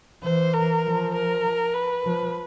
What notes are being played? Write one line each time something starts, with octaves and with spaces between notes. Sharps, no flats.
E3 C5
A#4
F3
A#4
B4
F3